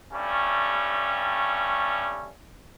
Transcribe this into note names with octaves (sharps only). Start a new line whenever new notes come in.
G2 G3 A3 C#4